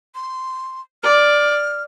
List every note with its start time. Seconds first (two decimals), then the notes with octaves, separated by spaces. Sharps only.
0.15 C6
1.03 D5 F6